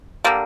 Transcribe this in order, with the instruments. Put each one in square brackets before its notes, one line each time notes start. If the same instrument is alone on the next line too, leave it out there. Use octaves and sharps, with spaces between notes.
[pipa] D3 G3 A#3